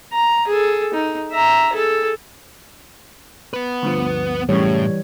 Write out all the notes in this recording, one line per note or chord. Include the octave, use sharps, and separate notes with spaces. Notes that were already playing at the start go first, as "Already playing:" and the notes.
A#5
G#4 A4
D#4
E5 A#5
G#4 A4
B3 B4
D2 G2 F3
F#2 A2 C#3 E3 G3 C#5